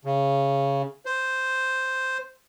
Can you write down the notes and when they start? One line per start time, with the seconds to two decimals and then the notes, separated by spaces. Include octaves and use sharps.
0.05 C#3
1.06 C5